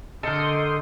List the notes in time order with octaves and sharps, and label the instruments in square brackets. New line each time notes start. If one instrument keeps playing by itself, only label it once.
[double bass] D3 [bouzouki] A4 A#4 [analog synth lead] D#5 [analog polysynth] C6 D#6 G6